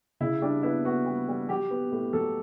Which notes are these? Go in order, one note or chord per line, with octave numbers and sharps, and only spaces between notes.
C#3 E4
G3 D4
B3 E4
B3 F#4
G3
G3
F#3 G4
B3
A2
F#3 A4